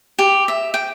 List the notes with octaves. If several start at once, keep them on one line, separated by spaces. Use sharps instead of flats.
G4
E5
G5